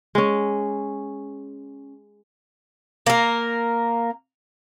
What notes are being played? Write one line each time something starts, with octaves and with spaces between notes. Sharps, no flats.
G#3 C#4
A#3 A#4